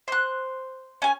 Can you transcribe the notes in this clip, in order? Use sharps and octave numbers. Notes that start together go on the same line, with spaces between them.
C5 F#6
C#4 G#5